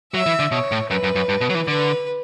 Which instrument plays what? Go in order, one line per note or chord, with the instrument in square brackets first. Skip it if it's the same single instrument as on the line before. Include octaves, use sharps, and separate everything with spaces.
[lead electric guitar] F#3 [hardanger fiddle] E5
[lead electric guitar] E3
D3
[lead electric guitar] B2 [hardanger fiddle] C#5
[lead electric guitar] A2
[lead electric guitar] F#2 [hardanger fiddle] B4
[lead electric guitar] F#2
F#2
G2
B2
F#3
E3
[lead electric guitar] D3 [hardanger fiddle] B4